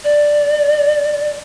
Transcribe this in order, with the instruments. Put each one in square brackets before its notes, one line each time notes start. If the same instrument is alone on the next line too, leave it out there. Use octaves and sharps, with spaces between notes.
[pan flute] D5